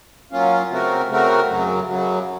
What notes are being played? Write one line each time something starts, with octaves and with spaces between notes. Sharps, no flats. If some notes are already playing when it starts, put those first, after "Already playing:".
F#3 A#3 C#4 F4
C#3 A3 C4 F#4 A#4
C#3 A3 C4 F#4 A#4
F#2 C#3 F#3
F#2 C#3 F#3